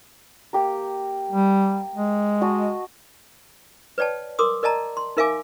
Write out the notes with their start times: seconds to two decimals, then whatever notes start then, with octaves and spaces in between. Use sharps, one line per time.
0.53 A#3 G4 A#4
1.31 G3
1.96 G#3
2.41 F#4 D#5 A5
3.98 B4 C#5 D5 G5 A5
4.39 A#4 C6 D6 D#6
4.63 A#4 D5 D#5 A5 A#5
4.97 C6
5.17 D#4 A#4 E5 F5 G#5 D6